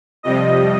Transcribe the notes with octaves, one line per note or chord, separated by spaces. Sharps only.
F2 C3 G3 D#5